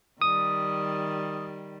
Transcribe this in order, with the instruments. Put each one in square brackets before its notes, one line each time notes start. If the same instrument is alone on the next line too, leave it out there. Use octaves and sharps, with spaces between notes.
[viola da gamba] D#3 G3 [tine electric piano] D#6